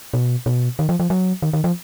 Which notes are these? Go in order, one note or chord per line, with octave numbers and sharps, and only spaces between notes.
B2
B2
D#3
F3
F3
F#3
D#3
D#3
F3